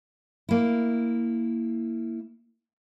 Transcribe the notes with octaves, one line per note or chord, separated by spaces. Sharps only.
A#3 E4